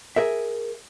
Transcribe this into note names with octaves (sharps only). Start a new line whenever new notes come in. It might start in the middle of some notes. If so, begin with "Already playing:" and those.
G#4 A#4 E5